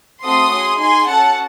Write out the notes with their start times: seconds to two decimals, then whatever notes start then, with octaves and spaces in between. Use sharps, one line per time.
0.23 A3 C4 F#4 A4 C6 D#6
0.52 C#4 G#4
0.80 D#4 G#4 G#5 C6
1.08 C#4 F#4 A4 F#5 A5